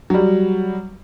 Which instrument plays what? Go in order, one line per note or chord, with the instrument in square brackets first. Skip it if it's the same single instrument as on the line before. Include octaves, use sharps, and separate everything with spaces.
[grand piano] F#3 G3